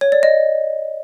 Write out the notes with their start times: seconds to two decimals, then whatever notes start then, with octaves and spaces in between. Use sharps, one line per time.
0.01 C#5
0.12 D5
0.23 D#5